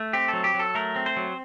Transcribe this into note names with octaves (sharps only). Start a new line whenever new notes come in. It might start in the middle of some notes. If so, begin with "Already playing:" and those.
Already playing: A3
C4 G4
F#3 A4
G4
F#3
A4
A3 A#4
C4
C5
F#3